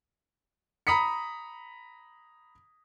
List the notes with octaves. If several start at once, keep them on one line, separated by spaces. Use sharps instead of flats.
A#5 B5 D#6 B6 C#7